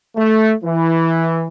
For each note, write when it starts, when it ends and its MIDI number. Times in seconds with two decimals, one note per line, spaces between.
0.17 0.52 57
0.64 1.48 52